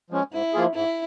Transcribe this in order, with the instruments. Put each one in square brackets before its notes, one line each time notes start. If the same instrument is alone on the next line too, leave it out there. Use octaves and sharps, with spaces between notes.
[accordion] F3 G#3 C#4
[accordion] G#2 [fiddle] E4
[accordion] F3 A#3 F4 G#4
[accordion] G#2 [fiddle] E4